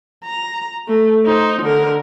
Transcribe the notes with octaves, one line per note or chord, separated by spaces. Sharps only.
A#5
A3
D#4 C5
D3 A#4